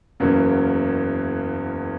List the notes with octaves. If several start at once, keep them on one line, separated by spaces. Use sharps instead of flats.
F#1 E2 C#3 F#3 A#3